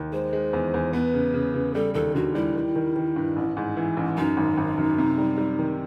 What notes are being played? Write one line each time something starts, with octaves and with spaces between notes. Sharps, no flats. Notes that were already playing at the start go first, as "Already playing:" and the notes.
Already playing: D#2
G#3 C5
G#3
E2
E2
B3 B4
C#3
C#3
C#3
G3 A4
D#2 A4
D3 F#4
G3 E4
D#3
D#3
D#3
G2
A1
G#2
E3
A1
F#2 D#4
G#1
G#1
F#2
C3
G3
G3
D#3